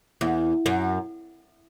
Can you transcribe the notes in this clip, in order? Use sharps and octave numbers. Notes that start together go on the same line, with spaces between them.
E2
F#2